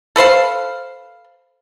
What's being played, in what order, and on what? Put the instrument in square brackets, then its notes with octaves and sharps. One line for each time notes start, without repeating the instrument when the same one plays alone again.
[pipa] A4 B4 C5 F5